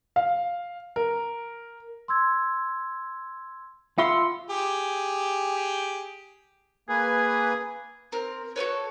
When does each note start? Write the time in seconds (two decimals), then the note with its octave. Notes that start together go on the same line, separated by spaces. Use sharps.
0.16 F5
0.96 A#4
2.08 C6 E6 G#6
3.98 F4 E5 F#5 B5 C6 E6 C#7
4.50 G4 G#4
6.89 A#3 G#4 B4 G#5
8.12 C4 A#4
8.56 F#4 A4 B4 C#5